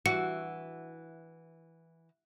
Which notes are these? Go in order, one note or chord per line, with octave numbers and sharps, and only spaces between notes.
E3 F#4 C#7